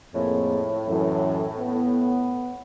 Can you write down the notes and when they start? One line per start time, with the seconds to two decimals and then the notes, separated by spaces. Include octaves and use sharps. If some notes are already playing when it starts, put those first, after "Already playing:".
0.14 F2 A2 A#3 G#4
0.87 F#2 E3 A4
1.58 B3